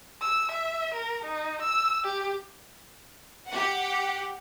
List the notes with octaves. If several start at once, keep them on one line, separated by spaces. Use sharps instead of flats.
E6
E5
A#4
D#4
E6
G4
G4 F#5